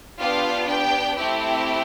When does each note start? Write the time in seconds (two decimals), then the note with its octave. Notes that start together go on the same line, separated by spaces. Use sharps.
0.20 B3 D4 F4 G4 F5
0.68 G4 G5
1.17 A3 C4 E4 G4 G5